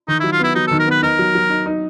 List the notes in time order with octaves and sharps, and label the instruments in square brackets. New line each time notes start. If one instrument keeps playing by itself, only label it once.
[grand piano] D#3 [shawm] D#4
[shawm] E4
[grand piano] F#3
[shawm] F4
[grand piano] B3 [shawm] E4
[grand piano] F#3 [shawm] D#4
[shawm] A4
[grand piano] D#3
[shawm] A#4
[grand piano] B3 [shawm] B4
[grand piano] D#4 [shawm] A#4
[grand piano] F#3
F#3
D#4
D#4